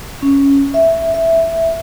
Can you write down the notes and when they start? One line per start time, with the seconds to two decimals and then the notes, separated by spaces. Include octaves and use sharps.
0.22 C#4
0.74 E5
1.14 E5